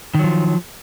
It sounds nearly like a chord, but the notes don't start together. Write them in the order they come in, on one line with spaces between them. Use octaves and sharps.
D#3 F#3 F3